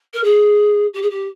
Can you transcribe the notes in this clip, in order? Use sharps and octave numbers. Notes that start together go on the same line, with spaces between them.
A#4
G#4
G4
G#4
G4